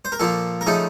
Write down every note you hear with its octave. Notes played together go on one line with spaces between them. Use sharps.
C5
A#4
A#2 F3 A#3 A4
A#4
C#3 F3 A3 D#4 A4